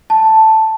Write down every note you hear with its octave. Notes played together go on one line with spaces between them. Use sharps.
A5